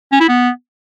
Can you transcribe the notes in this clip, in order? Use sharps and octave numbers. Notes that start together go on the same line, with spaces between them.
C#4
E4
B3